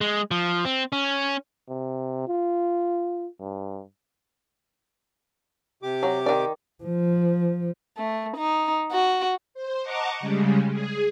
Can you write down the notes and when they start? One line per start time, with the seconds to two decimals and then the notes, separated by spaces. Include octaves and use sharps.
0.01 G#3
0.31 F3
0.65 C4
0.92 C#4
1.69 C3
2.28 F4
3.40 G2
5.83 C3 G4 D6
6.03 F#3
6.26 D#3 D5
6.84 F3
7.97 A3
8.37 D#4
8.91 F#4
9.54 C5
9.83 D#5 F#5 A5 A#5 C#6 D6
10.20 C#3 G3 G#3
10.72 G#4